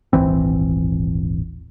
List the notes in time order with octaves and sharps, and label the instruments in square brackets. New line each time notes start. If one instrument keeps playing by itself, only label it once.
[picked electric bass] D#1 G#1 E3 C4